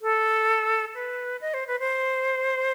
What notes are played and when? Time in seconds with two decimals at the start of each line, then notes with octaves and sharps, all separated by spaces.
0.02 A4
0.95 B4
1.41 D#5
1.54 C5
1.67 B4
1.80 C5